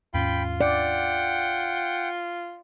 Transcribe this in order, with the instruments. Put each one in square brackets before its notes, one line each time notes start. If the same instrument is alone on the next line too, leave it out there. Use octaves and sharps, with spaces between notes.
[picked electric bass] D#2 G#2 C#4 [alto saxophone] F4 [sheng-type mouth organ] G5 B5
[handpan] D5 [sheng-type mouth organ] F#5 G5